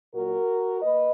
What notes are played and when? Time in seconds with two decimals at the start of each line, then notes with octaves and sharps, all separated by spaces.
0.14 A#2 F#3 A#3 F#4 A#4
0.82 A#3 B4 D#5